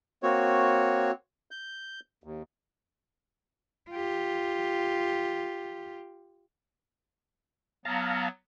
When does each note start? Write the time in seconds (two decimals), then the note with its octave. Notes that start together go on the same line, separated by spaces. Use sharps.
0.23 A#3 C4 F#4 C#5
1.51 G6
2.24 D#2
3.91 F4 G4
7.85 F#3 B3 F5 A5 A#5